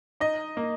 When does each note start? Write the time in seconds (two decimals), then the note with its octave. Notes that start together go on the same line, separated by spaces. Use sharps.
0.20 D#4 D#5
0.57 A#3